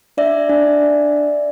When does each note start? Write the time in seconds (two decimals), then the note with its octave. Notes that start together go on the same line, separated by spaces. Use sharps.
0.17 D4 D5 E5
0.49 D4